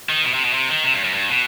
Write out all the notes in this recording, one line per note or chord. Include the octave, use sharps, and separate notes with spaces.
D#3
B2
C3
B2
C3
D#3
C3
G2
F#2
G2
B2